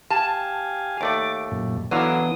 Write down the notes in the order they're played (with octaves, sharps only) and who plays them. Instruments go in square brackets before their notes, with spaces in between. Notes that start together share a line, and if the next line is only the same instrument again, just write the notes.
[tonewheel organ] G4 F5 G#5 [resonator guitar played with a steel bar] A5
[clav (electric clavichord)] D#2 A3 D5 [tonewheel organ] D6
[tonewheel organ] F#2 A#2
[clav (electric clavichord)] D3 F#3 F5 [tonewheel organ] E3 B3 D#6 [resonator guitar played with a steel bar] D4 E4